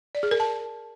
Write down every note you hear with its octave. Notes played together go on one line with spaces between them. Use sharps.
D5
G#4
A#4
A5